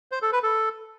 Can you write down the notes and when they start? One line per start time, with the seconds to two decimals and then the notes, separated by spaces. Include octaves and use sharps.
0.12 C5
0.22 A4
0.33 B4
0.43 A4